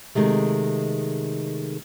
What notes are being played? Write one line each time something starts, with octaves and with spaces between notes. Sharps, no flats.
C3 D#3 G#3 A3